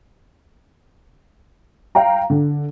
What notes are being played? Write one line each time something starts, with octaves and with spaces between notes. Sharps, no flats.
F5 G5 A#5
D3